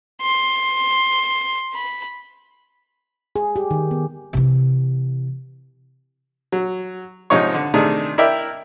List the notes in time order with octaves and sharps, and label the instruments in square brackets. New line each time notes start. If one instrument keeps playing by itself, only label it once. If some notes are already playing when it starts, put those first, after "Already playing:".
[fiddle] C6
B5
[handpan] G#4
G4
D#3
B3
[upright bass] C3 E3
[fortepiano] F#3
G#2 C3 F3 D#4 C#5 C#6
D3
C3 D#3 A3 D4 D#4 G#4
E4 A#4 D5 E5 G5